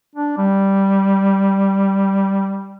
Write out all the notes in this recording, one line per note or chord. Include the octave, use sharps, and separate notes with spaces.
D4
G3